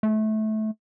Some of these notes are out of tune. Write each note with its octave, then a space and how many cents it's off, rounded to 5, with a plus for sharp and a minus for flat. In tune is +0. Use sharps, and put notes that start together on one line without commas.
A3 -20